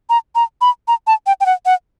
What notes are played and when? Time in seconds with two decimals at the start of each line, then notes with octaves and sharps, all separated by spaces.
0.10 A#5
0.35 A#5
0.61 B5
0.88 A#5
1.07 A5
1.27 G5
1.40 G5
1.46 F#5
1.66 F#5